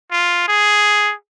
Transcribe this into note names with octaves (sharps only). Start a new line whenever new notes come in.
F4
G#4